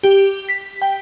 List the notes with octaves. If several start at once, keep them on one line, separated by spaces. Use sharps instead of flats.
G4
B6
G5